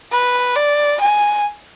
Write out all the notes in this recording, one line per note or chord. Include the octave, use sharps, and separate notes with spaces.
B4
D5
G#5